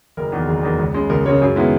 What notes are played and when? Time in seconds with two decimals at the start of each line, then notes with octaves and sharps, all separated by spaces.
0.17 F#1 A#4
0.32 E2 D#3
0.48 F#1 G#4
0.63 E2 D#3
0.79 C#2
0.94 C#3 G#3
1.10 C#2 A#4
1.26 C#3 G#3 A#4 C#5
1.42 F#2 G#4
1.56 D#3 G#3 B3 E4